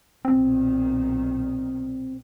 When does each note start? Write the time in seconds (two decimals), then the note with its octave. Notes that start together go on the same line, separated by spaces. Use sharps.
0.25 B1 A#2 D#3 C4